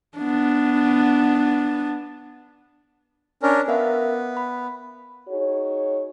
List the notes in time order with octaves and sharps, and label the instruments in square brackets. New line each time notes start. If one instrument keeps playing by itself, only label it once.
[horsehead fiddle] B3 D4
[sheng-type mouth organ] C#4 D4 A#4
[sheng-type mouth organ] B3 [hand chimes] A#4 E5 F5
[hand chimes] B5
[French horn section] D#4 F#4 G#4 C#5